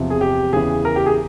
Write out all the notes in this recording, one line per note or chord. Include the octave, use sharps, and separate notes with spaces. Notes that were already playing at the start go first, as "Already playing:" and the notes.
Already playing: E2 C3 F3
G#4
G4
E2 C#3 E3 G#4
A#4
G4
G#4